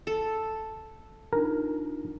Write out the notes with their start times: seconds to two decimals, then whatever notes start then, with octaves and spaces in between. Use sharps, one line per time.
0.07 A4
1.33 D4 D#4 F4 A#4